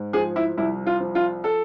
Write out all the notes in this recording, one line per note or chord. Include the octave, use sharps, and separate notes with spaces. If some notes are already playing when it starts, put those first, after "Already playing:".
Already playing: G#2
F3 G#4
E4
C2 E4
F4
F3
F4
A4